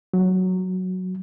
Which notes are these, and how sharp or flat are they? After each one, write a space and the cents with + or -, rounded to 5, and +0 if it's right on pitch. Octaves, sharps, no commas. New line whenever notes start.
F#3 +0